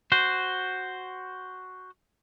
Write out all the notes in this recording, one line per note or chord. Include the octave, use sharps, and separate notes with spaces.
F#4 C5